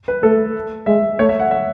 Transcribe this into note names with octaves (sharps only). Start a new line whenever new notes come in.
B4
A3 A4
G#3 E5
A3 C#5
E5
F#5
E5